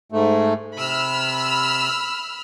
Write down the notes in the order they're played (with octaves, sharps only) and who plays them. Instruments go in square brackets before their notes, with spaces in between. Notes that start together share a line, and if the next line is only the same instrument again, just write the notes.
[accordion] G#2 A3
[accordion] C3 [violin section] B5 E6 F6